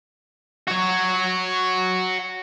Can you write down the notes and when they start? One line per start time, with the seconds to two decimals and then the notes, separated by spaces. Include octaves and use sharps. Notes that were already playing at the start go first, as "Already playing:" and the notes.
0.67 F#4 C#5